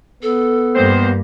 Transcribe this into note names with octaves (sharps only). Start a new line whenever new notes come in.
B3 A4
G2 D#3 A#3 C5